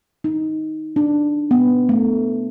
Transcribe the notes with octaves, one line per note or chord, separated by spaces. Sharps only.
D#4
D4
B3
A3